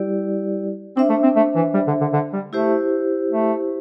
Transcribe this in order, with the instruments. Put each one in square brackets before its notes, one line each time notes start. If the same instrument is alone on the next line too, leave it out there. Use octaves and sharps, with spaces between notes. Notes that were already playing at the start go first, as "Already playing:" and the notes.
Already playing: [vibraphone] G3 E4 G4 D5
[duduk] C4 [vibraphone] D4 C5 E5
[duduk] A3
C4
A3
E3
G3
D3
D3
D3
G3
[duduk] A3 [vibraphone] E4 G4 C5
[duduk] A3